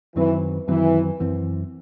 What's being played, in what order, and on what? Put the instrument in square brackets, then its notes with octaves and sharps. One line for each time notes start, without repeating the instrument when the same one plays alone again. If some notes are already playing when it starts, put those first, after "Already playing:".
[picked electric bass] F#2 D#3 F#3 C4 [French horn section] E3
[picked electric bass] F#2 D#3 F#3 C4 [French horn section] E3
[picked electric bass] F#2 E3 C4